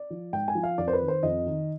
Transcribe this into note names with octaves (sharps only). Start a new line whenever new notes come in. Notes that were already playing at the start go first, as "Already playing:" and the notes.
Already playing: D5
F3
G#2 G5
G#5
F3
F5
F2 D5
C5
B4
D#3
C5
F2 D#5
D#3